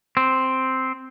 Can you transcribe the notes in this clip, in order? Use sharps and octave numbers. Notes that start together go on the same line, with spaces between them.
C4